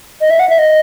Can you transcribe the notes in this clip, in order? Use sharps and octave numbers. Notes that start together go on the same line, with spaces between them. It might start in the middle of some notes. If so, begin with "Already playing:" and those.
D#5
E5
F#5
E5
D#5